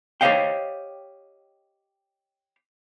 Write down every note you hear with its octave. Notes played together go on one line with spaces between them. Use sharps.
G4 C5 C#5 D#5 F5 G5